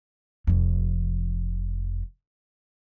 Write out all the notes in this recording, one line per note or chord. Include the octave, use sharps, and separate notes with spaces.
F1 F2